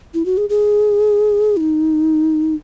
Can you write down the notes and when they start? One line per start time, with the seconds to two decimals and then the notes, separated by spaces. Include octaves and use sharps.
0.14 E4
0.26 F#4
0.37 G#4
0.49 G#4
1.57 E4
1.60 D#4